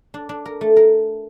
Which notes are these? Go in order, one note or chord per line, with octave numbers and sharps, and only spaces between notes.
D4
D4
A#4
A3
A#4